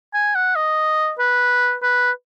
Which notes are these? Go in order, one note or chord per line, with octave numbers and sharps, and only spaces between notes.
G#5
F#5
D#5
B4
B4